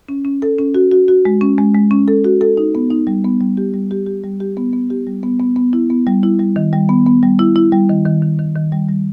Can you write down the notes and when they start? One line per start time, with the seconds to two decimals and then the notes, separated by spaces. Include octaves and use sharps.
0.09 C#4
0.25 C#4
0.42 A4
0.59 C#4
0.75 F#4
0.91 F#4
1.08 F#4
1.25 G#3
1.41 C#4
1.58 G#3
1.74 G#3
1.91 C#4
2.08 A4
2.24 F#4
2.41 A4
2.57 D#4
2.75 B3
2.90 D#4
3.07 G3
3.24 B3
3.40 G3
3.57 G4
3.74 G3
3.91 G4
4.06 G4
4.24 G3
4.40 G4
4.57 B3
4.73 B3
4.90 G4
5.07 G3
5.23 B3
5.40 B3
5.56 B3
5.73 E4
5.90 B3
6.07 G3
6.23 E4
6.40 G3
6.56 D#3
6.73 G3
6.89 B3
7.06 B3
7.23 G3
7.39 E4
7.56 E4
7.72 G3
7.89 D#3
8.06 D#3
8.22 D#3
8.39 D#3
8.56 D#3
8.72 G3
8.89 G3